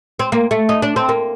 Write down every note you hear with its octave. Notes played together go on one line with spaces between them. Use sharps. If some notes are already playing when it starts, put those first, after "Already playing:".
C4
A#3
A3
D#4
D4
C4
A#3